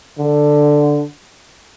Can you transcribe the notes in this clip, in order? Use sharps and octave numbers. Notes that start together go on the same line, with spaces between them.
D3